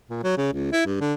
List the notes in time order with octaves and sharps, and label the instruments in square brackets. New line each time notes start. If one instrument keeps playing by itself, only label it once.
[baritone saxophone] A#2
F#3
C#3
C#2
E4
G2
D3